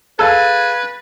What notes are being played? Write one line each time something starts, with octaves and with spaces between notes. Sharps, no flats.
G#4 A4 B4 F5 G#5 A6